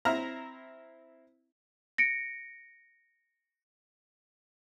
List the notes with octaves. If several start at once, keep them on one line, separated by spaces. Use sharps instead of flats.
C4 E4 E5 A#5 F6
A#6 C#7 D7